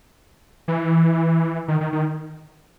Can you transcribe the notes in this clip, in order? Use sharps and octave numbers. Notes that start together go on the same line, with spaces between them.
E3
D#3
D#3
D#3